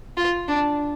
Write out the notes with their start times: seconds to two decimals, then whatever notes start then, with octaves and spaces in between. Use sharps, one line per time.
0.17 F4
0.48 D4